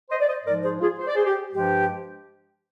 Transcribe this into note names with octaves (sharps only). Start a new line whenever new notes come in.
C5 D#5
D5
C5 D#5
G#2 F3 G#3 A#4 D5
G#4 C5
F4 G#4
C5
D5
G#4 C5
G4
G2 F3 G#3 G4